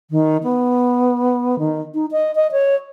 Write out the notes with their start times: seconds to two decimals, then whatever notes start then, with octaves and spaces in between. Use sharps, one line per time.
0.11 D#3
0.43 B3
1.59 D#3
1.94 D#4
2.11 D#5
2.35 D#5
2.52 C#5